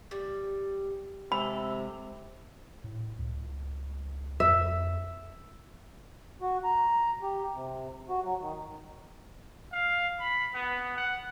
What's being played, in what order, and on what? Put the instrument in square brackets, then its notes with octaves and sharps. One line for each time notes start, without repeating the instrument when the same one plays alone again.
[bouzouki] G3
[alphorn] C3 [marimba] G#3 [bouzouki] A4 [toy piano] B5
[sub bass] A2
C#2
[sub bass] F2 [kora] E5
[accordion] F#4
A#5
G4
C3
F#4
F#3
D#3
[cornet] F5
B5
B3
F#5